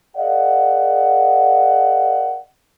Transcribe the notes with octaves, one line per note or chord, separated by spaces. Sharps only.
G#4 A#4 D5 D#5 F5 F#5